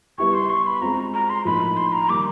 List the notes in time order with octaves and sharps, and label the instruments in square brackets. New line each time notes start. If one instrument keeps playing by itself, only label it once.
[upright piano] G3 B3 E4 G4 [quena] C#6
[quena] C6
C#6
B5
[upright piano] G#3 C4 F4 [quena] A#5
[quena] A#5
C6
[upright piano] A2 F3 A#3 D#4 [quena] B5
[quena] C6
A#5
[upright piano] D#3 G3 A#3 [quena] D6